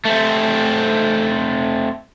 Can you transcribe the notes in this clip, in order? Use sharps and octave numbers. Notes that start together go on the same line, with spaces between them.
A3 C4